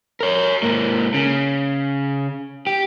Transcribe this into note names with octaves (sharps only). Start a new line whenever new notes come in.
A#4 C#5
G#2 A#3
C#3
G4